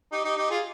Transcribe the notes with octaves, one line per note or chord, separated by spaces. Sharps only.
D#4 G4
D#4 G4
D#4 G4
F4 G#4